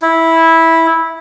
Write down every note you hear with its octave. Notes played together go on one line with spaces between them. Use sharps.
E4